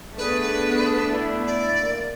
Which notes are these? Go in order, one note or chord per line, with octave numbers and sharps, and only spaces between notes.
A3 B3 D4 G#4 B4
E4
D5
A#3